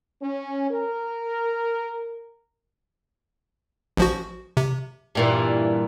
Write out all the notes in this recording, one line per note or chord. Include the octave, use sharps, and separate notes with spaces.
C#4
A#4
A1 F3 F#4
C3
G2 A#2 E3